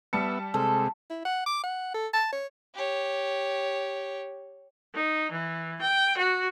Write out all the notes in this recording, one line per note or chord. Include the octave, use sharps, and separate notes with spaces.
G3 B3 E5 A5 C#7
C3 G#3 A4
E4
F#5
D6
F#5
A4
A5
C#5
G4 C#5
D#4
E3
G5
F#4